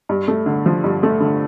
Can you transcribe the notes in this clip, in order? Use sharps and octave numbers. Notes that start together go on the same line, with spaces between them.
G2
A3
D3
F3
G2
A3
D3